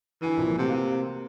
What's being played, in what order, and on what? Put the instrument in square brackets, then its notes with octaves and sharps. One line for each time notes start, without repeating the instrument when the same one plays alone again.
[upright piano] D3 G#5 D#7 [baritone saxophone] E3
[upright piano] C2 A#2 F3
[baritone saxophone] C3 [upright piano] A3 F#4 G4
[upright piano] A#3 F#6 D#7